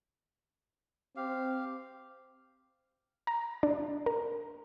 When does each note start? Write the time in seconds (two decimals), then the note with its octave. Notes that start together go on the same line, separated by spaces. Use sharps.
1.16 C4 G4 F5
3.27 A#5
3.63 D4
4.06 A#4